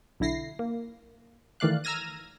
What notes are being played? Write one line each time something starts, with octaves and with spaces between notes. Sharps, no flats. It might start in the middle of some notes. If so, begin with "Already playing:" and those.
B1 D3 E4 A#6 C7
A#3
D#3 E3 A3 D5 F5 F#6
A#5 E6 F6 G#6 A#6 D#7